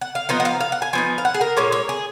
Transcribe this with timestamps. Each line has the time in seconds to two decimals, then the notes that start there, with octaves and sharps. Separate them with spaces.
0.01 F#5
0.15 F5
0.29 F3 B3 D#4 D#5
0.40 F#5
0.45 F5
0.60 F5
0.72 F#5
0.82 G#5
0.93 F3 B3 D#4 G#5
1.18 F5
1.25 F#5
1.34 G#4
1.41 A#4
1.57 A#2 G#3 C#4 C#5
1.72 C#5
1.89 G#4